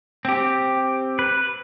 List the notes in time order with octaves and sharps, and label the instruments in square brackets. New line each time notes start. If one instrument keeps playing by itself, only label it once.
[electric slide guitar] C4 G4
[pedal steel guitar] B4